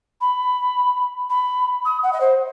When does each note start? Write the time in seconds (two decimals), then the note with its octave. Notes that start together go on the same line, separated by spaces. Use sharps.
0.21 B5
1.29 B5
1.85 D#6
2.02 F#5
2.12 D#5
2.20 C5